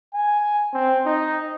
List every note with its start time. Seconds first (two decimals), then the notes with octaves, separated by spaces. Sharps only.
0.14 G#5
0.73 C4
1.05 D#4